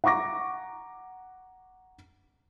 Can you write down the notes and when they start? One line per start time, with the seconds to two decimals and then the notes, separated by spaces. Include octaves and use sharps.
0.04 F#5 A#5 C#6 D6 A#6